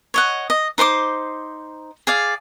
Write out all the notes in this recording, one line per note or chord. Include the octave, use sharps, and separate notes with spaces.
C#5 D#5 F#5
D#5
D#4 C5 C6 D6
G#4 D5 F5